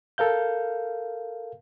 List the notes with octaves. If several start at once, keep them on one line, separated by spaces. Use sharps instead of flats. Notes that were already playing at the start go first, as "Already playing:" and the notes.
A4 A#4 F5 G6